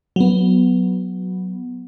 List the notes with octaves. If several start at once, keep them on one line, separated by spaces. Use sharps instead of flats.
F#3 B3